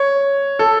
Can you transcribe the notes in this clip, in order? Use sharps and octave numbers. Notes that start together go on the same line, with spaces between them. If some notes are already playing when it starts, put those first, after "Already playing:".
Already playing: C#5
A4